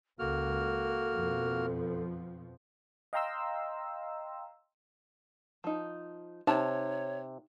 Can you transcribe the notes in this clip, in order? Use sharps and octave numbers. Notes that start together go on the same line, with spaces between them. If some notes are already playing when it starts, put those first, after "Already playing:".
C#2 A#3 F#4 A4 F6
F2 B2 F3
D#5 F5 G5 A#5 C6 E6
F3 D#4
C3 D#4 C#5 A5